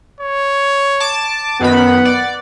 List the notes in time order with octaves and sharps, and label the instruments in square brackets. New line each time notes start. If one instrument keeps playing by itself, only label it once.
[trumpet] C#5
[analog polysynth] A5 D6
[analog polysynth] F#2 D#3 B5 [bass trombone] B3 [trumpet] F#5
[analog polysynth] D5